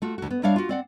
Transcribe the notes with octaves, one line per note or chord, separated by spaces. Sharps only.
A3 F4 F#4
D2 F#4
B3
G3 D4 C#5 D5 E5 F5
F4 F#4
C4 D5 F#5